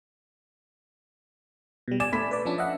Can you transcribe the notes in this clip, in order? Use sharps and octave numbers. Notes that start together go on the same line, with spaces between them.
B2 G3
D5 G#5 E7
A3 B5 B6
B4 D5
F3 C#4 D4
D#5 E5 F#5